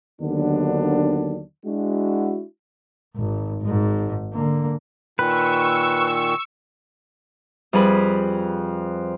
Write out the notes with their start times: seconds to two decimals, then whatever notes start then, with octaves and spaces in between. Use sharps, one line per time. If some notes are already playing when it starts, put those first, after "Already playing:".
0.21 D#2 D3 D#3 F#3 B3 D4
1.65 G#3 D4 E4 F#4
3.16 G#1
3.62 G#1 G#2
4.33 D3 A#3
5.19 A#2 D#3 B4 C#6 E6
7.73 F2 G3 G#4 B4 B5